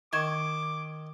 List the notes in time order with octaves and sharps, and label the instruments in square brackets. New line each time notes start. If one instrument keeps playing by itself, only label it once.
[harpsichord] D#3 [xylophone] C#6 G#6 E7 [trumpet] D6